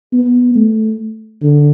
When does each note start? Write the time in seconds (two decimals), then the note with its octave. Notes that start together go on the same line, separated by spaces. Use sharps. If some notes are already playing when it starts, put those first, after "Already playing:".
0.13 B3
0.55 A3
1.42 D3